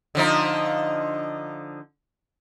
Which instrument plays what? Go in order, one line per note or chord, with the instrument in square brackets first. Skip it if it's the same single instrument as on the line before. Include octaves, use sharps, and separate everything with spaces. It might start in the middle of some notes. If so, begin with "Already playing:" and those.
[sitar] D3 F3 D#4